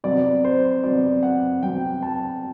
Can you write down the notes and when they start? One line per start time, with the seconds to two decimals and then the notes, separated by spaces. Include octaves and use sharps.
0.04 C3 F#3 B3 D5
0.44 C5
0.84 C3 F#3 B3 D5
1.23 F#5
1.62 C3 F#3 B3 G5
2.03 A5